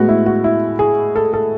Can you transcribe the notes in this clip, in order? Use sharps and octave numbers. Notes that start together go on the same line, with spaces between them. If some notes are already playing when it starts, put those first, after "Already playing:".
Already playing: A2 G#3 B3 F#4
E4
F#4
E4
G#4
A4
A4